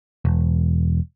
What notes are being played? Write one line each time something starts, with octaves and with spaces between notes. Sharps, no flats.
E1